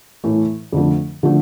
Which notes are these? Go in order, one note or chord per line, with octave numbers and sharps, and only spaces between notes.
A2 E3 A3
F2 D3 F3 A3
D3 F3 A3